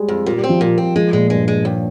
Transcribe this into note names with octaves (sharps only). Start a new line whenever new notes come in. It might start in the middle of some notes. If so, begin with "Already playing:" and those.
Already playing: G3 G#3
F2
A#2 G3
G3
C4
F3
A#2
C4
F3 G#3
A#2 G#3
G2 G#3
G#3
D#2